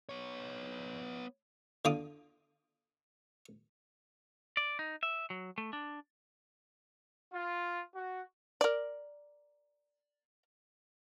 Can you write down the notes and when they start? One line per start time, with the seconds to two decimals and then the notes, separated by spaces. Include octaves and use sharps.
0.09 B3 C#5
1.85 D3 F4 D6 D#6
4.57 D5
4.79 D#4
5.03 E5
5.30 F#3
5.58 A3
5.73 D4
7.33 F4
7.94 F#4
8.61 A#4 D5